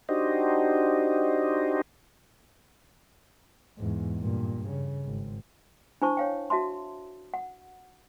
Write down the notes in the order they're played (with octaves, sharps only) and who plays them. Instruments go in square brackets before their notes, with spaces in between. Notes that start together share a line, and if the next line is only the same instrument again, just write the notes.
[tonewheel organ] D4 D#4 F#4 G4 C5 D#5
[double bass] E2 G#2
G2 A#2
C#3
G#1
[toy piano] D4 E4 C5 A5 C#6
C#5 F5 G5
F#4 E5 A5 C6
F#5